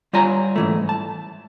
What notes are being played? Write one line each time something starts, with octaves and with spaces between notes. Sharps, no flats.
G3 F4 C#5 G#5 A#5
G#2 E3 A3
A5